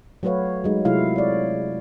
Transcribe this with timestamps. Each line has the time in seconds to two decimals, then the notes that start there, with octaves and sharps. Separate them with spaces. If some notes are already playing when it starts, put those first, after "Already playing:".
0.23 F#3 A3 F#4 B4 C#5 F5
0.64 F#3 G#3 D#4
0.85 C3 F#3 A3 E4 F4 F5
1.16 C#5 D5